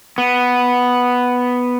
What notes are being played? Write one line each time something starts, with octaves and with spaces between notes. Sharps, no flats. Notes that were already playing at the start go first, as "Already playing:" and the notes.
B3